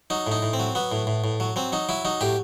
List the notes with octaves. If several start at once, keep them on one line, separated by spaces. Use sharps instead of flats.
F#3 D#4
A2 D#4
A2
C4
F#3
F#3 B3
A2
A2
A2
F#3
F#3 C4
F#3 D#4
F#3 E4
F#3 D#4
A2 G4